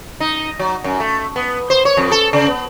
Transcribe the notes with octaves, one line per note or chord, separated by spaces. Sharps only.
D#4
F#3
F#2
A3
B3
C5
C#5
F2
A4
C#3
B3